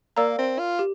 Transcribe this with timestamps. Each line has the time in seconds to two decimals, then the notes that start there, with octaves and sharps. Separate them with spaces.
0.17 A#3 A#4 D5 F5 A#5 E6
0.38 C4
0.59 F4
0.79 G4